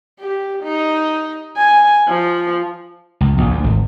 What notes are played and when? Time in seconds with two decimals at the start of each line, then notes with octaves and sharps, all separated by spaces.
0.20 G4
0.63 D#4
1.57 G#5
2.08 F3
3.21 C#2
3.38 A#1
3.51 D2
3.64 G#1